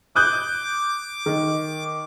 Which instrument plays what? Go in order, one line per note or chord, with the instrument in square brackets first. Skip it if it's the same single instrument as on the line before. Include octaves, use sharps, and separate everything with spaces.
[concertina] D6 [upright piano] D#6 F#6 G6
[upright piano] D#3